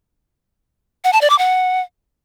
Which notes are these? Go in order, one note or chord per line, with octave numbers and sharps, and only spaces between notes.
F#5
A5
D5
D6
F#5